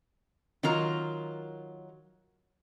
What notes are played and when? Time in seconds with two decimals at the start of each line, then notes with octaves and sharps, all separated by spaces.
0.63 D#3 F#3 F4 A#4 A#5